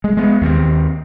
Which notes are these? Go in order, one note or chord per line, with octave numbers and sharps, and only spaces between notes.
G#3
G#3 B3
D#2 D#3 E3 C4